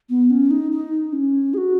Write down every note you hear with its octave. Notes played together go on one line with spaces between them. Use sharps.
B3
C#4
D#4
D#4
C#4
G#4
F#4